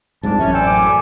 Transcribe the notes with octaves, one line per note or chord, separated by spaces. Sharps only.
C2 F2 G#2 D4 A5
A1 F#2 C#4 E5
C4 A4 D5 G5 G#5
D6
E3 A4